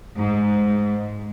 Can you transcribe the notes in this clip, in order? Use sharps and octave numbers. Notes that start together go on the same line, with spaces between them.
G#2